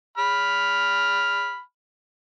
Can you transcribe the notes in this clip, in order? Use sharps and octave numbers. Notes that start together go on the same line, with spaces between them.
B5 F6